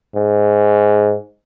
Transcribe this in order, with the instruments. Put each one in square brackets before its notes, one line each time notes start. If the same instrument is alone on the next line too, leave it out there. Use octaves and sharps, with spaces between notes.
[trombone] G#2